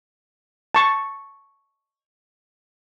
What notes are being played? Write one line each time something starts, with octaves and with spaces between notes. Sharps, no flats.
A5 C#6